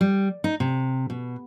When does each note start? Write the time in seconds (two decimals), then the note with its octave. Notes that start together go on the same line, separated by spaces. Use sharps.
0.01 G3
0.44 D#4
0.60 C3
1.10 B2